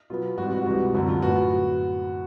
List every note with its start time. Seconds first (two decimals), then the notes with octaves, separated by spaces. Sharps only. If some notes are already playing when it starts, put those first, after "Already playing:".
0.10 B2 F#3 B3 F4
0.38 G#2 E3 G3 C4 F#4
0.51 F#4
0.66 C#2 C3 E3 G3 F#4
0.94 F#2 D3 G3 C4 F#4
1.09 F4
1.22 A2 F#3 B3 F#4